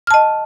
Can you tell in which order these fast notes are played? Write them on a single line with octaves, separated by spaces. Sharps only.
F6 A5 D#5